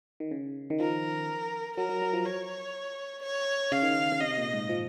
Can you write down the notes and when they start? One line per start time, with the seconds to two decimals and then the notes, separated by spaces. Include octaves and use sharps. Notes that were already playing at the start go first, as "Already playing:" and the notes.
0.20 D#3
0.31 C#3
0.70 D#3
0.80 F3 A#4
1.77 F#3 A#4
1.89 F#3
2.02 F#3
2.13 F3
2.25 C#5
3.23 C#5
3.72 C#3 F5
3.83 D#3
3.92 C#3
4.12 C#3
4.20 C3 D#5
4.37 A#2
4.53 G#2
4.69 F3